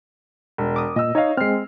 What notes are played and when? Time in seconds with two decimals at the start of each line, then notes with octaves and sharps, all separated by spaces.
0.58 E1
0.76 D6 D#6
0.96 A#2 D#5 E6
1.15 D#4 C#5 D#5 F5
1.37 G#3 C4 F6 C7